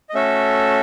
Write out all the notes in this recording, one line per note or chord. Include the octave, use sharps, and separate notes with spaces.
D#5
A3 C#4 F#4 A4 E5